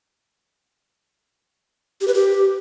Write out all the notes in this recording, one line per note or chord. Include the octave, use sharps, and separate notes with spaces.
G4
B4
G4